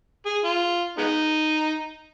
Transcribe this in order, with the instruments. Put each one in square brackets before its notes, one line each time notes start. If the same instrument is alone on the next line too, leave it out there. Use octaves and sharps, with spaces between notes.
[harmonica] G#4
F4
G#3 B3 D#4